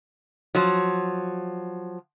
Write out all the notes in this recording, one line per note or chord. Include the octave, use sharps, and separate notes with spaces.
F3 F#3